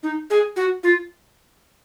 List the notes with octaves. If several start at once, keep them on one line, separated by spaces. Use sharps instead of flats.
D#4
G#4
F#4
F4